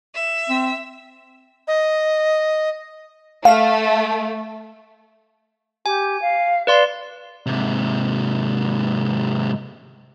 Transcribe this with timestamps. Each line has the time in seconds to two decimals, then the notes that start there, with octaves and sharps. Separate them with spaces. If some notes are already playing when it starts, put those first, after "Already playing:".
0.15 E5
0.50 C4
1.68 D#5
3.45 A3 F5
5.86 G4 G#5
6.21 F5
6.67 B4 D5 F5 C6
7.46 G#2 C3